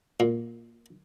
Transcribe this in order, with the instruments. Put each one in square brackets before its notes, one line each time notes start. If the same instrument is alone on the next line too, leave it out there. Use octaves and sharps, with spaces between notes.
[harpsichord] A#2